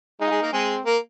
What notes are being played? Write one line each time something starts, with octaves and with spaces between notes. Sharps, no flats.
G#3 D#4 G#4
F4
G#3 G#4
A#3 A#4
G#3 C4 G#4
A#3 A#4